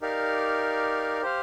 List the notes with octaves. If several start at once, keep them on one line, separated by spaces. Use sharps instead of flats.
D#4 G4 A#4 D5 F5
G4 C5 F5